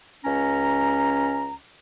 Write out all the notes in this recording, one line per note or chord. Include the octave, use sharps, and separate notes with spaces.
C#2 C#4 A#5